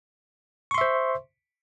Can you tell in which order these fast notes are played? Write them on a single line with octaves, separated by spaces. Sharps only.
C#6 C6 E5 C5